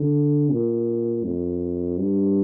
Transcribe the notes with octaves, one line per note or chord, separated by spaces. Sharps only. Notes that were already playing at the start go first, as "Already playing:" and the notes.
Already playing: D3
A#2
F2
G2